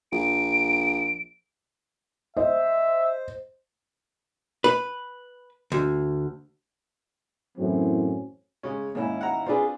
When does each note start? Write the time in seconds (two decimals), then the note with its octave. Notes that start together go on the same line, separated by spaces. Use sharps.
0.12 A#1 D7
2.37 C5 D#5 E5
4.64 B4
5.72 D2
7.58 F#2 A2 E3 F#3 C4 C#4
8.63 C#3 G#3 C#4
8.95 D#2 G#2 C#4 E4
9.21 F#5 A#5
9.46 C4 D4 F4 G#4 B4